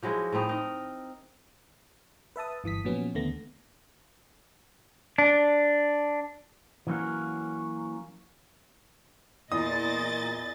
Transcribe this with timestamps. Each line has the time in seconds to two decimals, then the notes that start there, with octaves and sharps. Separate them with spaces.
0.03 F3 F#3 G#3 E4
0.33 A2 A3 C4 D#4
0.49 D#4 A#4
2.36 B4 E5 A5 D#6
2.64 G1 E3 D#6 B6
2.85 A#2 F3 F#3 B3 C#4
3.15 D#2 D3 A3 B3 A#6
5.18 D4
6.87 E3 F#3 A#3 B3 C#4 F#4
9.52 E2 A#2 D#5 D#6 A6